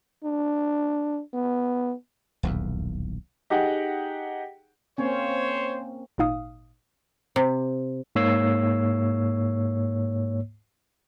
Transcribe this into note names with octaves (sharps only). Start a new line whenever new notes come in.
D4
B3
D#1 B1 E2
D#4 G4 G#4 F#5 G5
A#3 C4 C#4 C5 C#5
G#1 A#2 D#4 F5 D#6
C3
G#2 A#3 C#5 E6 C7